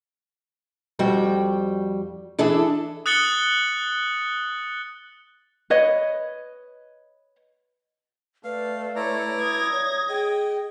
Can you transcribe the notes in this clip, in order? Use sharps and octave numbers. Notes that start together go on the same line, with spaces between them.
F2 G3 F#4 G5
E3 D4 G#4 A4 D5 E5
D#6 F#6 A6 C#7 F#7 G7
B4 C#5 D#5
A3 B4 D5 F5
E4 C#5 D5 A#5
D#6 G#6 A#6
C#5
G#4 D#5 G5